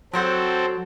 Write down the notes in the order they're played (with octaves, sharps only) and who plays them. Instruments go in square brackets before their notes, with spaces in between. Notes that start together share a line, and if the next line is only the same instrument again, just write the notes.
[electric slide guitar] F#3 [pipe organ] C4 A4 [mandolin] A#4 C5 F#5